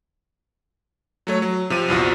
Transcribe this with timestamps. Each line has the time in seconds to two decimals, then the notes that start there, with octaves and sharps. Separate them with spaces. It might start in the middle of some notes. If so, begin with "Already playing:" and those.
1.27 F#3 A3 C#5
1.42 F#3
1.70 C3 F3 D#7
1.88 A#1 E2 F3 F#4